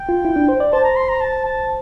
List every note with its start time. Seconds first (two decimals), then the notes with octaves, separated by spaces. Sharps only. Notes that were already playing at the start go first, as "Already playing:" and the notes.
Already playing: G5
0.09 F4
0.25 E4
0.36 D4
0.48 C5
0.60 D5
0.73 C5 A5
0.84 A#5
0.96 C6
1.09 A#5
1.21 A5
1.45 A5